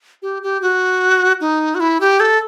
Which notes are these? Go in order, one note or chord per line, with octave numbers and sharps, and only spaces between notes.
G4
G4
F#4
D#4
F#4
E4
G4
A4